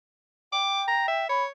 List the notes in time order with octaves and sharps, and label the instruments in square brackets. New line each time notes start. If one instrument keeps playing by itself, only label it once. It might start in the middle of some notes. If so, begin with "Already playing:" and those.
[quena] G5 [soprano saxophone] D6
[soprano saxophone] A#5
E5
[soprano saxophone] C#5 [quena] B5